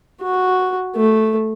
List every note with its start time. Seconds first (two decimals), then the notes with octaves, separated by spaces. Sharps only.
0.21 F#4
0.96 A3